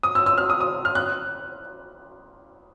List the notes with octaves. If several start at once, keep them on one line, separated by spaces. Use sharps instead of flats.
D#6
E6
E6
F6
D#6
D#6
F6
F#6